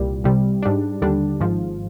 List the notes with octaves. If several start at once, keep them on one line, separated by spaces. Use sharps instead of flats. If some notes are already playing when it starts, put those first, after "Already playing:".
Already playing: C2 A#2 G3
C2 C3 G3
G#2 G3 D4
D#2 D3 G3 D4
G#1 G#2 F3